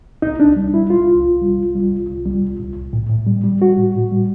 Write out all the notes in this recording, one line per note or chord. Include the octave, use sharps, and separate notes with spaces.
C2 D#4
C2 D4
G3
G3 E4
C2 F4
C2
C2
G3
C2
G3
C2
C2
G3
C2
C2
C2
A2
A2
G3
G3
G3 F#4
A2
A2
G3